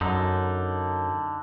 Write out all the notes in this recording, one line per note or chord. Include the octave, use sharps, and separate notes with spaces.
F#2 D3 D#4